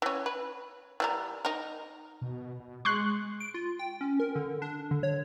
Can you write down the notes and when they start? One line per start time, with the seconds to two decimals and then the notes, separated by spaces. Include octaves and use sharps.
0.02 E3 C#4
0.26 B4
1.00 E3 G3 A#4
1.45 D#4 A#4
2.21 B2
2.60 B2
2.85 G#3 C6 C#6 F#6
3.40 D7
3.54 F4
3.79 G5
4.01 C#4
4.20 A#4
4.36 D3
4.62 D4
4.91 D3
5.03 C#5